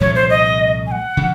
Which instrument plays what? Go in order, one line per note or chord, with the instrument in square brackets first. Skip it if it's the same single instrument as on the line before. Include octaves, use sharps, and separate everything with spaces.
[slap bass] C2 A#2 F3 A3 [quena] C#5
[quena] C5
D#5
G#5
F#5
[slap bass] C#3 F3